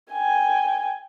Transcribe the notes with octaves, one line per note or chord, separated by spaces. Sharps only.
G5 G#5